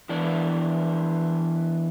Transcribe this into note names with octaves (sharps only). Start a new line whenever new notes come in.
E3 B3 D4